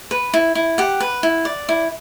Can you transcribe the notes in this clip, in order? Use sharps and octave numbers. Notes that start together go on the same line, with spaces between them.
B4
E4
E4
G4 F#5
B4
E4
D5
E4